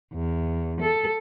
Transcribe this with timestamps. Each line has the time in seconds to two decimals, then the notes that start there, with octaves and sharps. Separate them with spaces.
0.14 E2
0.81 A4